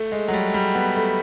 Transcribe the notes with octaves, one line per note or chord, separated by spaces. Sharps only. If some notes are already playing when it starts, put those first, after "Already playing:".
Already playing: A3
G#3
F#3
G3
G3
B3
A3